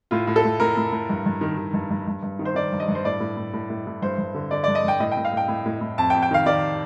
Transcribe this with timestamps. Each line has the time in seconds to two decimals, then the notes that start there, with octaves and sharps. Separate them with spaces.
0.11 A2 F4
0.27 A2
0.36 A4
0.44 A2
0.60 A2 A#4
0.77 A2
0.92 A2
1.10 G2
1.26 G2
1.41 D#3
1.58 D#3
1.74 G2
1.90 G2
2.07 G2
2.23 G2
2.39 D#3
2.45 C5
2.55 D#3 D5
2.72 G2
2.80 D#5
2.88 G2
2.95 C5
3.05 A2 D5
3.20 A2
3.37 A2
3.53 A2
3.70 A2
3.86 A2
4.02 G2 C5
4.18 G2
4.34 D3
4.51 D3 D5
4.64 D5
4.68 G2
4.75 D#5
4.84 G2 G5
5.00 A2 D#5
5.12 G5
5.17 A2
5.25 F5
5.32 A2 G5
5.48 A2
5.65 A2
5.81 A2
5.98 F2 A5
6.10 G5
6.15 F2
6.22 G5
6.31 D#3 F5
6.46 D#3 D5